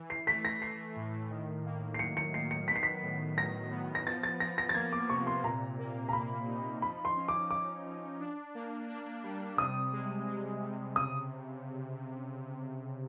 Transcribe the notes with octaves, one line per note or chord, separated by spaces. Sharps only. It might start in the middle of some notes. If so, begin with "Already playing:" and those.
Already playing: E3
C7
A3 B6
A#6
A3 C7
A2
D#3
A#3
C7
F#3 C#7
C#7
D#3 C7
C#7
B3 B6
C7
B6
A2
F#3 A#6
B3
A#6
F3 A6
A6
F3 A#6
A#6
A6
A#3 G#6
D6
C3 C#6
C6
A#2 A#5
A#3
A#5
A#3 B5
D#4
F3 B5
C6
C#4
D6
F3 D6
F3
D4
A#3
D4
G3
C3 D#6
G#3
G#3
C3
C#3 D#6